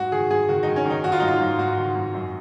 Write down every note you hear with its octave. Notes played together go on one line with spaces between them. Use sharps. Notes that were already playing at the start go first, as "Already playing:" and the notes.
Already playing: G#2 F#4
D#3 G#4
G#2 G#4
D#3 F#4
D#3 D#4
C#4
D#3
D#4
D#3 F#4
F4
G#2 D#4
F4
G#2
G#2 F#4
D#3
G#2
F#2